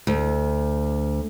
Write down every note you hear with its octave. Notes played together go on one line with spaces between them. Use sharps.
D2